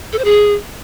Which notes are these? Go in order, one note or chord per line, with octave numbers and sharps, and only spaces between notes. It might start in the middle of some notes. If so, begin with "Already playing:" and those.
A4
C5
G#4